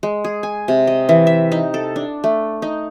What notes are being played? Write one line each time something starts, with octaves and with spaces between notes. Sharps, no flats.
G#3
G#4
G#5
C3
D#5
E3
E5
D#4
A4
D4
A3
D#4